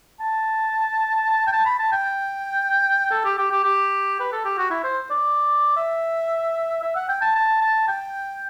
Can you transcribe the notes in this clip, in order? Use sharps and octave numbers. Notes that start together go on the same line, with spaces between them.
A5
G5
A5
B5
A5
G5
A4
G4
G4
G4
G4
B4
A4
G4
F#4
E4
C5
D5
E5
E5
F#5
G5
A5
A5
A5
G5